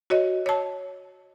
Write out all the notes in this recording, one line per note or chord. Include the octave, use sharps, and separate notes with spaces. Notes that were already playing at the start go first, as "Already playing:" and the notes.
F#4 C#5 D#5
C#5 A5